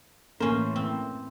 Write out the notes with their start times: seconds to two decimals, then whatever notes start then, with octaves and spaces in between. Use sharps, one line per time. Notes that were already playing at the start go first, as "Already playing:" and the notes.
0.40 A2 E3 A#3 C#4 C5
0.76 C4